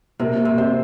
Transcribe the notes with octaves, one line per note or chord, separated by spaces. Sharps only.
C3 A#3 A#4
C3
C4 C5